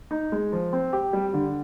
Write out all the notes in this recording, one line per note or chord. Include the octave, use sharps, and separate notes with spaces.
D#4
G#3
F3
C4
G4
G3
D3